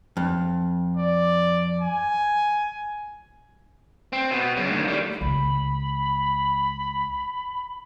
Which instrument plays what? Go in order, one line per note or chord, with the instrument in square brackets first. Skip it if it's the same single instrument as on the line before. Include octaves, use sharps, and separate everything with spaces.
[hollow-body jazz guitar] F2
[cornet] D5
G#5
[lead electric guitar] C4
B2 B3
F#2 C#3
D2 D#3
A2 G3
[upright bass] C#2 [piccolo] B5